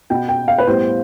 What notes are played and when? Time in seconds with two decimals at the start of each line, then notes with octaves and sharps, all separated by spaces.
0.10 B2 B3 G5
0.29 G5
0.48 F5
0.58 B4
0.66 A2 G3 B3 C5